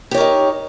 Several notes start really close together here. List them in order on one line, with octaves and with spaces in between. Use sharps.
G4 C#5 A#4 D#4